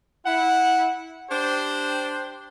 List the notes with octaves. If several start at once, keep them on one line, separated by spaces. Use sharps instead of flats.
E4 F#5
D4 G4 C5